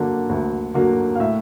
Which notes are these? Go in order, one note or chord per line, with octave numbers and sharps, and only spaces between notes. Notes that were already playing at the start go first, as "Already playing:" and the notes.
Already playing: D3 F#3 A#3
D2
D3 F#3 A#3
F5
A2 E5